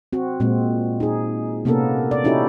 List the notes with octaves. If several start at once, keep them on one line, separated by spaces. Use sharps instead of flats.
C4 F#4
A#2 G#3 C4
D#4 G#4
C3 A#3 B3 C#4 A4 A#4
D5
C#4 D#4 E4 F#4 G4 A4